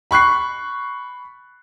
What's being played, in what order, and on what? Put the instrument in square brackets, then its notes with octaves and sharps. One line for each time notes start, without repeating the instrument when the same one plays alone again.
[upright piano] B5 C#6 F#6 C7